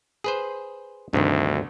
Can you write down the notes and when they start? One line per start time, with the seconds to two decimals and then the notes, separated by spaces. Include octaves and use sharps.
0.24 G#4 B4 C5
1.13 D2 G2 C3 D#3